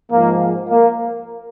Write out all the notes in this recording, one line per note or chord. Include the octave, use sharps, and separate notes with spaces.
G#2 F3 A#3
A#3